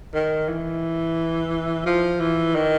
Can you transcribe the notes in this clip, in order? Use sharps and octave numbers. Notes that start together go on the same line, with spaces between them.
D#3
E3
F3
E3
D#3